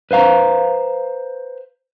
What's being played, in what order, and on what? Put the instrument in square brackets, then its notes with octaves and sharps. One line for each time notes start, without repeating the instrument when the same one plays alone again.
[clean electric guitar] B4 C5 F5 A#5